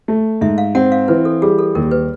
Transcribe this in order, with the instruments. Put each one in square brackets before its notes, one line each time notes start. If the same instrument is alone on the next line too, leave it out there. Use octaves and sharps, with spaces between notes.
[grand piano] A3
[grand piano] G#2 [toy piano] E5
[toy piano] F5
[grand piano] C4 [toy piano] F#5
[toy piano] F5
[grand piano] E3 [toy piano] B4
[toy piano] A4
[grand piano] G3 [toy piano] G#4
[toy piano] A4
[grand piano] D#2 [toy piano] A#4
[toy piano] B4